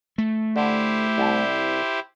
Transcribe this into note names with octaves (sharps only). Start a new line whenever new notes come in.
A3
D3 E4 G4 C5
C2 A5